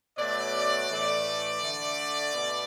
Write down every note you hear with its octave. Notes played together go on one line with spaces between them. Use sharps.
B2 F#3 A3 D5
A2 E3 A3
D3 A3
B2 A3